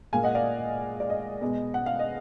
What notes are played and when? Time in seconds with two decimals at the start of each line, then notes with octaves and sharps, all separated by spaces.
0.13 A#2 G#3 F5 G#5
0.23 D#5 F#5
0.35 D5 F5
1.00 D5
1.10 D#5
1.41 B2 G#3
1.74 F#5
1.86 F5
1.99 D#5